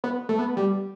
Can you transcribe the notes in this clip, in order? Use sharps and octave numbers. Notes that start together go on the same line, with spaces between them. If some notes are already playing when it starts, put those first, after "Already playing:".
B3
A3
B3
G3